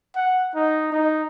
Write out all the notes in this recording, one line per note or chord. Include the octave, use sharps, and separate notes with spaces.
F#5
D#4
D#4